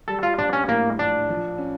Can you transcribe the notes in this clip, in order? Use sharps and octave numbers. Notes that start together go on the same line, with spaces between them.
G3 A4
F4
A#1 D4
C#4
A2 A#3
A#1 D4
F3
C#4